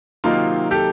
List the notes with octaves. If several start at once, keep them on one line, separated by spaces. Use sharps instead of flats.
C3 D#3 F#3 A#3 D#4 F4
G4 A4